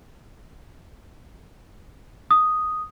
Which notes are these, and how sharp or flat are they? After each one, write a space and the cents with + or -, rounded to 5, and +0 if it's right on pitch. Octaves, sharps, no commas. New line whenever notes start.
D#6 +0